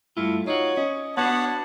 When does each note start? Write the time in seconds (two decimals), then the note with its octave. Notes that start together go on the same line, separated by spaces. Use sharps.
0.17 G2 A3 E4 F4
0.47 D#4 F4 F#4 C#5
0.77 C#4 D#5
1.17 B3 D4 F#4 B4 C#5 F#5 A5